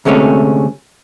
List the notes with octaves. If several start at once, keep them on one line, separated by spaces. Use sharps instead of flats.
D2 C3 G#3 A3 C#4